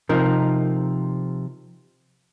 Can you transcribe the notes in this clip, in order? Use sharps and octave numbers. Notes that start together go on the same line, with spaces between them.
C3 F3 D#4 A#4